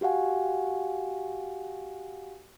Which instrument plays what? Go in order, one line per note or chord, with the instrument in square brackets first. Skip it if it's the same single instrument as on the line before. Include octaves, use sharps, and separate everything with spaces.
[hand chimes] F#4 G4 F5 F#5 G#5